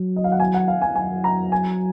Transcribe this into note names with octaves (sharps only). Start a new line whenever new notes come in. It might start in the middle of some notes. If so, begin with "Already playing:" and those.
Already playing: F#3
D#5
F5
F#5
G#5
F#5
F5
G#5
F#3 G#5
A#5
G#5